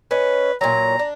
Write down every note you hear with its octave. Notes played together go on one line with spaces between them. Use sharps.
C#4 B4 D#5
A#2 E3 F#3 A#5
D4